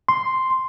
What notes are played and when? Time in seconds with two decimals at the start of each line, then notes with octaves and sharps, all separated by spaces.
0.09 C6